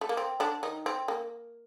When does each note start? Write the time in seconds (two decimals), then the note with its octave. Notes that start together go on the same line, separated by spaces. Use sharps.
0.01 A3
0.09 A#3
0.17 C4
0.40 D3 D4
0.63 D#3 D#4
0.86 C4
1.08 A#3